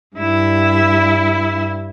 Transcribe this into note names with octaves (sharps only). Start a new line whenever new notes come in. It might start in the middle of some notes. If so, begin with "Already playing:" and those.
G2 E4